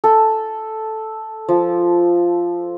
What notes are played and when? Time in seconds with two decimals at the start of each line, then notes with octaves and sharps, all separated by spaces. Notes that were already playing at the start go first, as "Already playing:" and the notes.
0.04 A4
1.48 F3